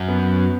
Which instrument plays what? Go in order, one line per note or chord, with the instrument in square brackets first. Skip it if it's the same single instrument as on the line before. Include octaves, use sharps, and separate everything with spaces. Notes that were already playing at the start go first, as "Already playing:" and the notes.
Already playing: [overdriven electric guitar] F#2
[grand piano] B3